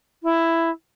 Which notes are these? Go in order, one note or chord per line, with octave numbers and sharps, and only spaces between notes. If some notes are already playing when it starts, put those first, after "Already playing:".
E4